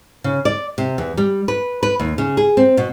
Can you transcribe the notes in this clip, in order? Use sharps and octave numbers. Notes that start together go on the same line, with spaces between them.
C#3
D5
C3
E2
G3
B4
B4
D#2
C#3
G#4
C4
B2